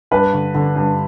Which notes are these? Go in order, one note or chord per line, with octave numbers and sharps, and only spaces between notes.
G2 B4
D3
D3
G2